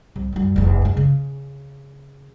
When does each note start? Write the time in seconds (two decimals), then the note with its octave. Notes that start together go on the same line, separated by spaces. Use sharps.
0.16 C2
0.33 F#2 G3
0.56 F1 E2
0.82 F#2 G#3
0.97 C#3